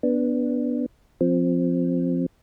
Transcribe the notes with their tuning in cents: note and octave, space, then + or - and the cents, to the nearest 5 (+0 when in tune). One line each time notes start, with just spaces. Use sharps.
B3 -5 D4 +0
F3 +0 C4 +0